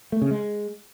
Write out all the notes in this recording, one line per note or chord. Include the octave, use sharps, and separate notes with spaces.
A3
C#3
G#3